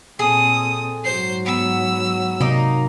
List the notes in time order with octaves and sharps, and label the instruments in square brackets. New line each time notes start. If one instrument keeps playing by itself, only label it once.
[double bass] A#2 C4 [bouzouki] G#4 A4 [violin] D#6
[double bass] G#2 F#3 [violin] C5 C7
[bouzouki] B3 [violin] E6
[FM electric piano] C3 [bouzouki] A#3 D#4